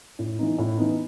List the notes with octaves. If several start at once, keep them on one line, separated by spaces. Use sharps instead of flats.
A2
E3 B3 D#4
A2
E3 B3 D#4